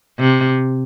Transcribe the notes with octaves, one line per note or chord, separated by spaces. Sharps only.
C3